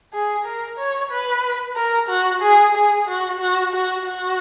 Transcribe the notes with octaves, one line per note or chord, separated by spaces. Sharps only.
G#4
A#4
C#5
B4
A#4
F#4
G#4
G#4
F#4
F#4
F#4
F#4